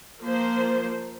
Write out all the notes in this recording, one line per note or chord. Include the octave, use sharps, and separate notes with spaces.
F3 A#3 C5